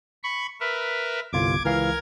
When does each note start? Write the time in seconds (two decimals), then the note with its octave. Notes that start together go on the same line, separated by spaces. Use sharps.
0.23 B5 C#6
0.60 A#4 B4 E5
1.33 G1 C2 F4 D6 G#6
1.65 C#2 E3 A#4 F5 G#6